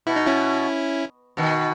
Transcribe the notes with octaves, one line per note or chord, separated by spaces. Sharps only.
B2 E4
D#4
C#4 E4
B2 D#3